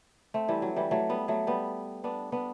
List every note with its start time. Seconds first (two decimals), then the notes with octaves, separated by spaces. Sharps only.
0.34 A3 C4
0.48 E3 G3
0.62 F#3
0.76 E3 G3
0.91 F#3 A3
1.09 G3 B3
1.28 F#3 A3
1.47 G3 B3
2.04 B3 D4
2.32 B3 D4